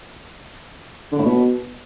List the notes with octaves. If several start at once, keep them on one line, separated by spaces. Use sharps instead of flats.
D3
A2
B2